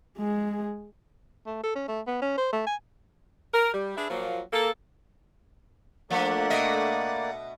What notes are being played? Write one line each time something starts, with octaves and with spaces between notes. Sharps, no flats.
G#3 G#4
A3
A4
C#4
A3
B3
C#4
C5
A3
G#5
A#4
G3
D4 G#4 B4 E5
A#2 F3 F#3 A#3 F4
A#3 A4
F3 A3 A#3 D4 D5 F#5
B2 D#5 E5